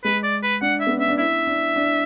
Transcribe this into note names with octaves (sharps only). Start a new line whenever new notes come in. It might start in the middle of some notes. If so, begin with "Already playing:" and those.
G#3 B4
D5
B4
D4 F#5
E5
B3
C#4 E5
D4
E4 E5
D4
D4